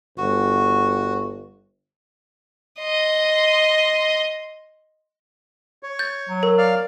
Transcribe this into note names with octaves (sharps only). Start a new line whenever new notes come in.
G1 F#4
D#5 C6
C#5
G6 A6
F#3
A#4
D5 F5 F6